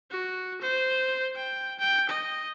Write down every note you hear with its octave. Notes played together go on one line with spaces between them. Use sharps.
F#4
C5
G5
G5
D#5